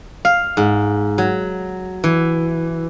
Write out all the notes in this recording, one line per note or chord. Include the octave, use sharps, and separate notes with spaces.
F5
G#2
F#3
E3